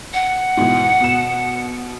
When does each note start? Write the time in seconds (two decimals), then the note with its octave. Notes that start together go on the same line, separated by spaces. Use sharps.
0.13 F#5
0.57 G#2 B2 E3
1.01 B2 E7